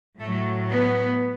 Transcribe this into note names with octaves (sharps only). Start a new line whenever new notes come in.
A2 F#3 A3
B3